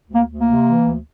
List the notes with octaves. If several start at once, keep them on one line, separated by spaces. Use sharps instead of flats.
D2
A#3
D2
A#3
C3
E3
D2